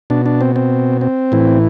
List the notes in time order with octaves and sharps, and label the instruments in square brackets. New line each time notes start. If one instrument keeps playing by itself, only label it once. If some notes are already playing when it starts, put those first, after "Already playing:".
[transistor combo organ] B2 D4
D4
C4
C4
C4
A2 E3